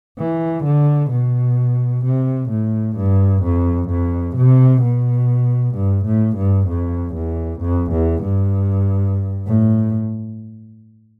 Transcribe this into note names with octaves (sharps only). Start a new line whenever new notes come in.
E3
D3
B2
C3
A2
G2
F2
F2
C3
B2
G2
A2
G2
F2
E2
F2
E2
G2
A2